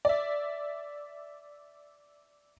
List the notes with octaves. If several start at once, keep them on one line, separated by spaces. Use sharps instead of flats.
D5 E5